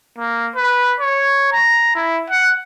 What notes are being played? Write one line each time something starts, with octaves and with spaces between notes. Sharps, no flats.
A#3
B4
C#5
A#5
E4
F#5